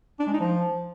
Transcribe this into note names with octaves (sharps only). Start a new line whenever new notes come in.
D4
G#3
D#4
F3